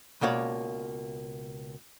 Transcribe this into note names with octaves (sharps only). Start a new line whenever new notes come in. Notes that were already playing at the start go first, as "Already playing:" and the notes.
C#2 B2 A#3 C#5 D5